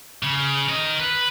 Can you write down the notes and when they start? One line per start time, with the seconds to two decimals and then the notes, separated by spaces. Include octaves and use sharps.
0.23 C#3
0.68 A#4 D#5
1.00 B4